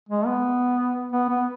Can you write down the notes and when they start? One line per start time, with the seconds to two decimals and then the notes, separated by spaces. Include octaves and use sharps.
0.09 G#3
0.26 B3
1.12 B3
1.29 B3